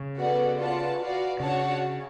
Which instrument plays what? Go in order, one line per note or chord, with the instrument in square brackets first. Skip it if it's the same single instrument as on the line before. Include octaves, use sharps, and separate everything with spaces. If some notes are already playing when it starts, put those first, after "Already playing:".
Already playing: [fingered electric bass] C#3
[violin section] B3 F#4 A4 D5 F#5
F4 B4 D5 F#5 A5
F#4 B4 D5 F5
[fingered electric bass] C#3 [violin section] D4 F#4 C#5 F#5 A5